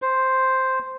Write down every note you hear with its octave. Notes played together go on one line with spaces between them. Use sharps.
C5